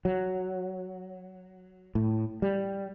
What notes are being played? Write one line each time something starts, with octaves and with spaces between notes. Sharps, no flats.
F#3
A2
G3